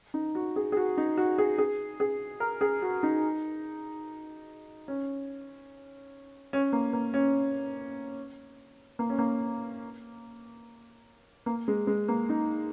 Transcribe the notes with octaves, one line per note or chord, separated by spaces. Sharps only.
D#4
F#4
G#4
G#4
F#4
D#4
F#4
G#4
G#4
G#4
A#4
G#4
F#4
D#4
C#4
C#4
A#3
A#3
C#4
A#3
C#4
A#3
A#3
G#3
G#3
A#3
D#4